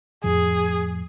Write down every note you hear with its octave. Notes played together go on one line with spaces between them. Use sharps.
F2 A2 F3 G#4